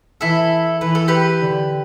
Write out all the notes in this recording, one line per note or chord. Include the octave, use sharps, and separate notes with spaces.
E3 E4 A4
E3 B4
A4
G4 B4
D3